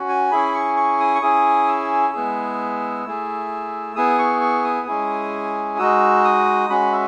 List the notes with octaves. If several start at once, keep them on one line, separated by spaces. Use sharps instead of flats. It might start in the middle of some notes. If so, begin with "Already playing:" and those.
Already playing: C#4 F#4
G#5
C#4 E4 G#4 B5
C#6
C#6
D#6
C#6
C#4 E4 G#4 D#6
E6
G#3 B3 E4 G#4
A3 E4 G#4
B3 E4 G#4 D#6
C#6
C#6
D#6
G#3 C#4 E4 G#4
G#3 D#4 F#4 E6
D#6
G#3 C#4 F#4 B5
E5